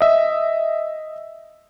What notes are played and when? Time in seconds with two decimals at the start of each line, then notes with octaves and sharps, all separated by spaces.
0.01 D#5 E5